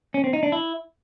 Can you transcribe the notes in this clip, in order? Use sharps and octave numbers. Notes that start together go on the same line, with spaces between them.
C#4
C4
D#4
D4
E4